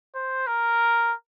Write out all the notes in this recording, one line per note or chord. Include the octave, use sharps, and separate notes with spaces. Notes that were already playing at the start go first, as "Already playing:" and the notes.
C5
A#4